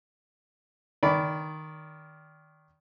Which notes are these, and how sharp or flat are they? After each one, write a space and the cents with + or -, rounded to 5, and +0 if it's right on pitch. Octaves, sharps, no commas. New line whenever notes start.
D#3 +0 D5 -25 B5 +5